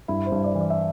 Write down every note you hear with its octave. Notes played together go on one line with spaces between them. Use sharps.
G2 E4
C5
G2
D5
E3
D5
E5